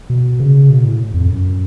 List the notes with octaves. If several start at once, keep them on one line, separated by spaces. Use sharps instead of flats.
B2
C#3
B2
A2
F2
F#2